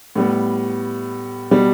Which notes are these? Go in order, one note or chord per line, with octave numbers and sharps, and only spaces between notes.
A2 G3 B3
B2 G3